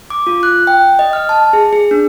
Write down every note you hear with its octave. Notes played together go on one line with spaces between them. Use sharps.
D6
F4
F#6
G5
D#5
F6
A5
G#4
G#4
D4